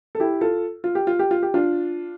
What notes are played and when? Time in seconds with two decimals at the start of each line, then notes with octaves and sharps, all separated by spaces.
0.15 A4
0.20 E4 G4
0.41 F4 A4
0.84 F4
0.95 G4
1.07 F4
1.19 G4
1.31 F4
1.43 G4
1.54 D4 F4